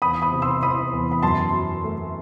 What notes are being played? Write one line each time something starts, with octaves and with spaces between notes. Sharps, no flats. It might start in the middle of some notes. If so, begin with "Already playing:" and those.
E2 B5 D#6
B5 D#6
C3
C6 E6
E3 B5 D#6
E2
B5
F#2 A5 C6
F#3
A3